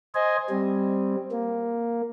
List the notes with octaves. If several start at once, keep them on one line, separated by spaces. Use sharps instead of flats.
C5 D#5 G#5
G3 C4
A#3